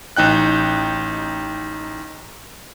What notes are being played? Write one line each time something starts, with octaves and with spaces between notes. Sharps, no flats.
A1 D#4 G5 F#6